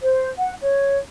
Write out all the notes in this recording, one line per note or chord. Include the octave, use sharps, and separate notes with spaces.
C5
F#5
C#5